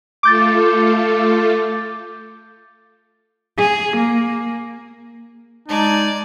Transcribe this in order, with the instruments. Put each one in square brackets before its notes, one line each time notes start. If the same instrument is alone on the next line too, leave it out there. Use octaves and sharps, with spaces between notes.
[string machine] A3 F4 A4 [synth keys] D6 G6 A6
[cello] G#4
A#3
[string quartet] G#3 [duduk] D#4 [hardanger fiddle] D5 G#5 [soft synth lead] A5